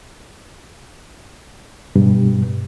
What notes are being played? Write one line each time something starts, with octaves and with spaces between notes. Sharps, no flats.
G2 B2